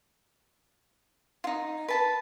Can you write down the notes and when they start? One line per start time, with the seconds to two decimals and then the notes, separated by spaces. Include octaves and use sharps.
1.44 D#4 F4
1.88 B4 A5 B5